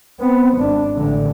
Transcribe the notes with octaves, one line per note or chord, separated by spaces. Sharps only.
B3 C4
G#1 D4
A1 D3